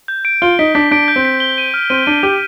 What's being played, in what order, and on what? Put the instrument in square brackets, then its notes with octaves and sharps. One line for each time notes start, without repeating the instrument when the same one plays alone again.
[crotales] G6
D7
[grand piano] F4 [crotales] G7
[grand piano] D#4 [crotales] B6
[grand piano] D4 [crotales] B6
[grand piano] D4 [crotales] D7
[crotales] G6
[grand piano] C4
[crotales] B6
G7
D#7
F6
[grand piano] C4 [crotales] D#7
[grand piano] D4 [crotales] D#7
[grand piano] G4 [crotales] D#7